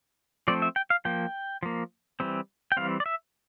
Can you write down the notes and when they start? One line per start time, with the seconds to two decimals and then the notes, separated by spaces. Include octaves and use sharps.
0.48 F3 A3 C4 D5
0.62 E5
0.76 G5
0.90 F5
1.05 F3 A#3 G5
1.63 F3 A#3
2.20 E3 G3 C4
2.72 G5
2.77 E3 G3 C4 F5
3.00 D5
3.06 E5